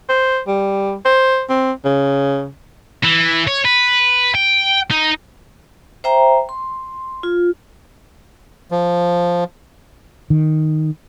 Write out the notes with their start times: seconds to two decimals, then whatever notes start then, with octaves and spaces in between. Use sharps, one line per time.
0.09 C5
0.47 G3
1.05 C5
1.49 C4
1.85 C#3
3.04 E3
3.47 C#5
3.65 B4
4.35 G5
4.91 D#4
6.04 C5 E5 G5 A#5
6.49 C6
7.23 F4
8.71 F3
10.30 D#3